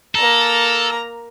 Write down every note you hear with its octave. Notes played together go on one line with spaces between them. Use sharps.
A#3 A4 A#5